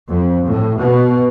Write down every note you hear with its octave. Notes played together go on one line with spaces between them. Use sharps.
F2
A2
B2